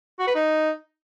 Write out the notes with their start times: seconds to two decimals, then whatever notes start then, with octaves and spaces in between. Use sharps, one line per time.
0.19 F#4
0.27 B4
0.35 D#4